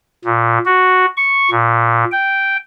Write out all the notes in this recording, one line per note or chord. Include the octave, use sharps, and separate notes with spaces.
A#2
F#4
C#6
A#2
G5